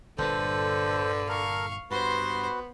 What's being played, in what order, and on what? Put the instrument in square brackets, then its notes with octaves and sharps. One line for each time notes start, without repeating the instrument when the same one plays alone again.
[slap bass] G1 G2 A#2 [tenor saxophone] D3 [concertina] A4 C5 [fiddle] B4
[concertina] A4 A#4 [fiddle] F5 C#6
[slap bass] G2 [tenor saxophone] B3 [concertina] F#4 B4 [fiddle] C5 C6